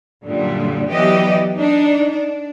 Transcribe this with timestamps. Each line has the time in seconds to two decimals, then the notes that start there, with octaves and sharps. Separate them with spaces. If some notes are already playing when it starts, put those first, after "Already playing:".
0.26 F#2 A#2 D3 G3
0.89 E3 F#3 B3 G4 D5 D#5
1.55 D4 D#4
2.10 D4